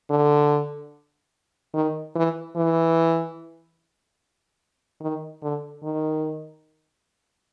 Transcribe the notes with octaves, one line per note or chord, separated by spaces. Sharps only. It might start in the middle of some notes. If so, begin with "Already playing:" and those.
D3
D#3
E3
E3
D#3
D3
D#3